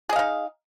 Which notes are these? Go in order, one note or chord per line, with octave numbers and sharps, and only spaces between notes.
D#4 G#4 D#5 F5